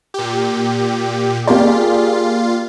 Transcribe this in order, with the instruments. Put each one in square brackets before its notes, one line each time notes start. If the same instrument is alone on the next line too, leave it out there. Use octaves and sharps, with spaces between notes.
[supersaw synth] A#2 G4
[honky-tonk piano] A#3 G4 D5 [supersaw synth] F4 [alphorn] G#4